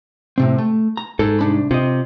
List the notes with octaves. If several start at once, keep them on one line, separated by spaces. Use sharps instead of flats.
A2 C3 C4
A3
A#5
G#2 A4
C2 D4 B5
C3 F4 D#5